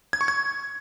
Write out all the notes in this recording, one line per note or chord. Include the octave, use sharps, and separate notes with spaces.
G#6
C#6
G#6